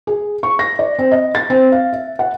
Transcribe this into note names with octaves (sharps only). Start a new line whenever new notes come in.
G#4
C#6
A#6
D5
C4
D#5
A6
C4
F5
E5
F#5